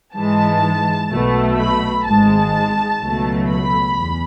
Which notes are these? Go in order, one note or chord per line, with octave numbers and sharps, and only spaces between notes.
G#2 E3 G#3 A5
B1 B2 A3
B5
G#1 G#2 G#3 A5
C#2 B2 F#3 A3
B5
E2